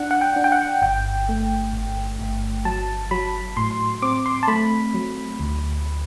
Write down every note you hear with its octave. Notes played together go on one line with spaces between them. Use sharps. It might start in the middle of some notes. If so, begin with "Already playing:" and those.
Already playing: D4 F#5
F#5
G5
D4
G5
F#5
G1 G5
A3
G1
G1
F#3 A5
F#3 B5
A2 C6
C4 D6
C6
A5
A3 B5
F#3
D2